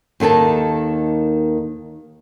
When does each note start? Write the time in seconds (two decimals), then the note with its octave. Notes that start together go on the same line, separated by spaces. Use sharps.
0.20 D#2 D#3 A4 A#4 A5